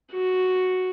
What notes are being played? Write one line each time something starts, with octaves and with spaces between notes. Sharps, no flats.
F#4